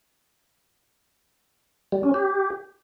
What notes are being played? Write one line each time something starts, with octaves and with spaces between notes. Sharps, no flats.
G3
C#4
G4